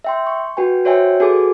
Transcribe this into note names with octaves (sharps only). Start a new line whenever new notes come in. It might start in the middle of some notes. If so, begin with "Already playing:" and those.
E5 G5 C6
C#6
F#4 B4 G5 G#5
F#4 C5 C#5 E5 G5 G#5
F#4 G#4 A4 B4 G#5 D6